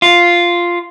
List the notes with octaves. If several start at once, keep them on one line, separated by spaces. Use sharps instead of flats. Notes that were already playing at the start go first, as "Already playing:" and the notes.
F4